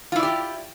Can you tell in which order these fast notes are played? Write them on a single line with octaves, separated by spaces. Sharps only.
F4 E4 D5 G4